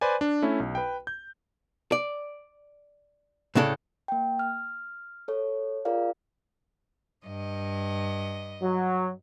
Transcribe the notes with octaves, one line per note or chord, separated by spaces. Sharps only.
B4 C5 D5 G#5
D4
A3 C#4 E4
B1
B4 G5
G6
D5
A2 C#3 D4 A4
A#3 G5
F6
A4 C#5
F4 G#4 A#4 D5 F5
G2 D#5
F#3